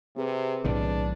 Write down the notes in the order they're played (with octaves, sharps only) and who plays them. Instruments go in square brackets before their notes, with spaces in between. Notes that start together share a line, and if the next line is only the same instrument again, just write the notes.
[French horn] C3 [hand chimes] C4 G#4 B4
[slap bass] B1 A2 D#3 [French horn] D4